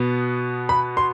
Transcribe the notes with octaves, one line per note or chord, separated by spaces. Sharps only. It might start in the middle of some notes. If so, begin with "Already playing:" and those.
Already playing: B2 B3
B5
C6